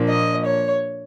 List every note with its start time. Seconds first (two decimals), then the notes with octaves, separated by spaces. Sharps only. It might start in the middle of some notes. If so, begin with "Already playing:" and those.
Already playing: A#2 F3 A#3 D4
0.09 D#5
0.45 C#5